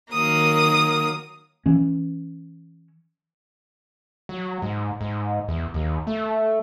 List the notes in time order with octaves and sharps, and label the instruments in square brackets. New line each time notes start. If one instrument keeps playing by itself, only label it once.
[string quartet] D#3 F#3 A#3 D#6
[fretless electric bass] E3 C#4
[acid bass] F#3
G#2
G#2
E2
D#2
A3